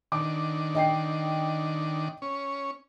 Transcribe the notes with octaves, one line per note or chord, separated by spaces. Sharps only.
D#3 D4 D6
D#5 G5 C7
C#4